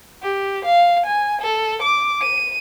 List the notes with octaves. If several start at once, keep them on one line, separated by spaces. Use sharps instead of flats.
G4
F5
G#5
A4
D6
D#7